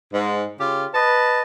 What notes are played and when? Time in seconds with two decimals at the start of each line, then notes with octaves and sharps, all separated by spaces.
0.13 G#2
0.59 C#3 F4 G4
0.94 B4 D#5 A5